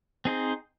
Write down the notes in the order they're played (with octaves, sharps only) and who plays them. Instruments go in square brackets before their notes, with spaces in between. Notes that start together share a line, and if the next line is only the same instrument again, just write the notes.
[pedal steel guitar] C4 D#4 G#4 C5